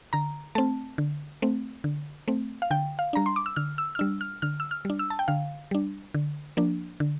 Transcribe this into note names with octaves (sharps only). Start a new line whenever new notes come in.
D3 A#5
A3 C4 A5
D3
A3 C4
D3
A3 C4
F5
D3 G5
F5
G3 D4 A#5
C6
D6
E6
D3 F6
E6
F6
G3 D4 E6
F6
D3 F6
E6
F6
G3 D4
E6
A5
G5
D3 F5
G3 D4
D3
F3 A#3 D4
D3